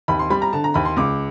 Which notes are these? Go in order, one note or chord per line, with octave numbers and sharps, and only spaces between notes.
D#2 B5
C6
G3 B5
A#5
D3 A5
A#5
D#2 B5
C6
C#2 D6